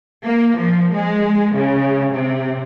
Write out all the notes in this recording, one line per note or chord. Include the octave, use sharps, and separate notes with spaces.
A#3
F3
G#3
C#3
C3